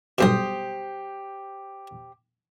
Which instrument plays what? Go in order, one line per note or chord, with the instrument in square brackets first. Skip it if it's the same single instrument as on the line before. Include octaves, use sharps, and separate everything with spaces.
[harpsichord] B1 G2 B2 [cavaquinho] G4 C5 D#6